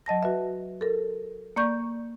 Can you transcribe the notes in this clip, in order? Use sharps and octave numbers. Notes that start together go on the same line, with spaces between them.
F#3 D#5 A5 A#6
F#4 B4 E5
A4 A#4
A#3 D5 C#6 G6